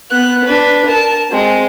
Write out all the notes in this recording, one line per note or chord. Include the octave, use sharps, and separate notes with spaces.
B3 F#6
D4 B4
A#4 A5
G#3 C4